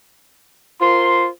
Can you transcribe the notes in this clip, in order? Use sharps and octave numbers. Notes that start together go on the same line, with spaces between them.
F4 A#4 C5 C6